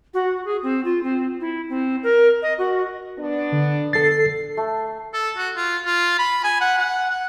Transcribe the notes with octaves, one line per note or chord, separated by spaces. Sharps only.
F#4
G#4
C4
F4
C4
E4
C4
A#4
D#5
F#4
B3 D4
D3
A4 A6 C7
A3
A4
F#4
F4
F4
B5
G#5
F#5
F#5
F#5